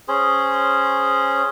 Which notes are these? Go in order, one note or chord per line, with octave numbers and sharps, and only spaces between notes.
C#4 G#4 C5